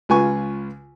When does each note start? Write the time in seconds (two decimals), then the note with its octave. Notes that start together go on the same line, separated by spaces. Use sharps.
0.09 C#2 F4 B4 G#5 C#6